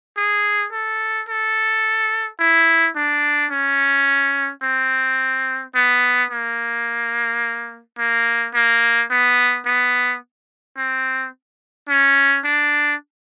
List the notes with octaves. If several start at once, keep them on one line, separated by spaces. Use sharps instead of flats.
G#4
A4
A4
E4
D4
C#4
C4
B3
A#3
A#3
A#3
B3
B3
C4
C#4
D4